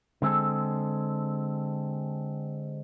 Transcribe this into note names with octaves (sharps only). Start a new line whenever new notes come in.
D3 G#3 C4 G#4 A4